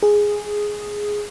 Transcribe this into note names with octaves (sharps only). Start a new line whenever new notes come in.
G#4